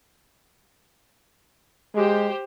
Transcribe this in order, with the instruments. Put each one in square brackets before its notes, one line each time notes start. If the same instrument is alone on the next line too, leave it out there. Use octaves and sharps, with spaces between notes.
[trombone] G#3 [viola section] G4 C5